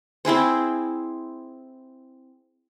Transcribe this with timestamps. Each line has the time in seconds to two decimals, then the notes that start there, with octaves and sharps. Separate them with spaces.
0.25 C4 E4 G#4 C5